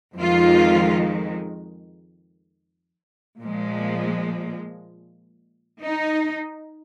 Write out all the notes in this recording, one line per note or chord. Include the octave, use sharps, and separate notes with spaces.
F2 D#3 G#3 F4
A#2 F3 G#3
D#4